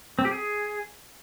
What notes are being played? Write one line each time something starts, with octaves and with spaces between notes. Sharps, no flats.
C4
G4
G#4